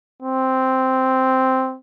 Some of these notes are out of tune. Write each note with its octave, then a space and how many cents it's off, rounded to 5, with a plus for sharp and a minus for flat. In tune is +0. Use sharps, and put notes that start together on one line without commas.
C4 -5